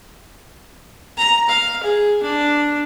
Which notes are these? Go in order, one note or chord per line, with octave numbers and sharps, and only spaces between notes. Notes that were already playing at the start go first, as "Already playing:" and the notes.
A#5
F5
G#4
D4